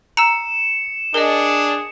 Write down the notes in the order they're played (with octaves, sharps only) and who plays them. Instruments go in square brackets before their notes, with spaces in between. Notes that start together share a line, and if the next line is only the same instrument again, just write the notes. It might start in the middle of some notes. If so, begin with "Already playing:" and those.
[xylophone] A#5 E6 [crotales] C#7 E7
[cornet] D4 [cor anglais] G#4 [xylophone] A#4 D#5